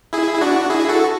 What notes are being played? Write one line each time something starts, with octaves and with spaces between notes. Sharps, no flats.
E4 G#4
E4
D4 F#4
E4 G#4
F#4 A4